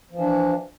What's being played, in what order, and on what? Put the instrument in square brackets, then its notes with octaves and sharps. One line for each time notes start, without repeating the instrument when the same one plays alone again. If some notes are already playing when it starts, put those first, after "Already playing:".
[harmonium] F3
E3
D4